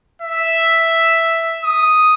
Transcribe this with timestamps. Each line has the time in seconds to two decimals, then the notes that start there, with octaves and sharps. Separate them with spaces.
0.22 E5
1.63 D#6